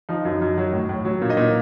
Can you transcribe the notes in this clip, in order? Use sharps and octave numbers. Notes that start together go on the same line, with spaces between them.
F3 D#4
F#2
F#2
F#3
A2
A2
F#3
A#2
D#4 D#5
A#2